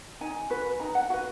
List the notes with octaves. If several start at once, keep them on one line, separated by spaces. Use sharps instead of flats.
D#4 G#5
F#4 B4
D#4 A#5
F#5
F#4 B4 F5